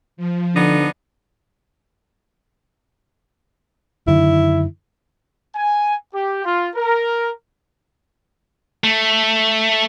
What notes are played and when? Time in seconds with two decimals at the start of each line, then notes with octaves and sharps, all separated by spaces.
0.17 F3
0.55 D3 B3 D4 D#4
4.07 F#2 D3 D#3 E4
5.55 G#5
6.14 G4
6.45 F4
6.75 A#4
8.84 A3